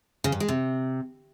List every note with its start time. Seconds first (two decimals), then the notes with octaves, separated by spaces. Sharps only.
0.24 C#3
0.32 G2
0.40 G#3
0.48 C3